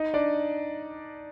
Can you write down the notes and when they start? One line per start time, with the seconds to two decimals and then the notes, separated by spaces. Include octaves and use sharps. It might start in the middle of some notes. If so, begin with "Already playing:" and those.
Already playing: D#4 D#5
0.14 D4 D5